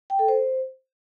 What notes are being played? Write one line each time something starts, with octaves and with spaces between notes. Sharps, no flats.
G5
A4
C5